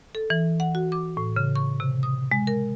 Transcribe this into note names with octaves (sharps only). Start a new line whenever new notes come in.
A4
E3
F#5
F#4
D6
A2
C#3
C#6
C3
D#6
G#3
A#4